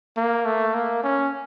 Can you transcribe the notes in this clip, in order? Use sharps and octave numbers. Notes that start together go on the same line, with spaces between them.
A#3
A3
A#3
C#4